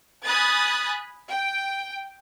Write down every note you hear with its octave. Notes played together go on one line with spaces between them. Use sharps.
G#5 B5 D#6 F#6 A6
G5